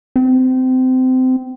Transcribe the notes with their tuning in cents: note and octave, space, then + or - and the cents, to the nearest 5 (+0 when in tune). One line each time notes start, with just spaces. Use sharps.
C4 -25